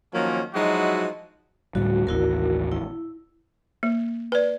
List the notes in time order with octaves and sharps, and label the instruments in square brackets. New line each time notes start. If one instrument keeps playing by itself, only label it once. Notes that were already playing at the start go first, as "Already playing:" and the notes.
[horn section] D#3 F3 F#3 A#3 C#4
F3 F#3 G#3 D#4 E4 F#4
[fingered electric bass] D2 A2 G3 [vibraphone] F#4
[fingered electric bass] A1 D#2 [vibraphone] E4 F#4 A#4
[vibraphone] E4
[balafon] A#3
B4 D5